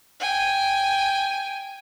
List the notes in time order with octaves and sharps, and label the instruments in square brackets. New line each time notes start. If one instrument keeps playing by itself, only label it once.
[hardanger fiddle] G5 G#5